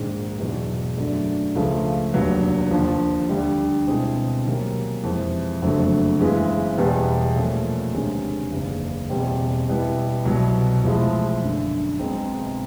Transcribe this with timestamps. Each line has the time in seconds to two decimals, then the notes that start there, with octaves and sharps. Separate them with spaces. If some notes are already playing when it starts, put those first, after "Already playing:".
Already playing: A#1 G#2 D#3
0.39 E2 B2 F#3
0.97 F#2 D3 F#3 A3 D4
1.55 C#2 C#3 F3 A3
2.13 F1 D#2 D3 F#3 B3
2.71 D#2 D3 F3
3.29 D2 D3 G3
3.87 B2 G#3 C4 E4 G#4
4.45 C3 D#3 F#3 A#3 C#4
5.03 F2 C3 E3 G#3
5.62 F#1 F2 D3 F#3 A3
6.19 F#2 C#3 E3 G#3 B3
6.77 E2 B2 G3 B3
7.36 A#2 F3 A3 C#4
7.94 D2 C3 D#3 G#3 C#4
8.52 F#1 E2 C#3
9.10 E2 B2 G3 C4
9.68 B2 G3 B3 E4
10.25 C2 B2 F#3
10.84 A1 A2 F3 G#3
11.42 G1 F#2 D3
11.99 B1 B2 G#3 C4 D#4